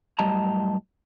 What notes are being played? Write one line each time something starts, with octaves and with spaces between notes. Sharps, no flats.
F#2 A2 G3 D#5 A5 A#5